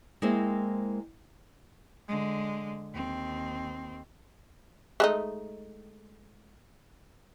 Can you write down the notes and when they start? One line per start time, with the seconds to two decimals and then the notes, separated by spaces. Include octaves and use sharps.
0.22 G#3 A#3 C4 E4 C5
2.08 D3 G#3
2.94 D#2 C4
5.00 G#3 A3 D#4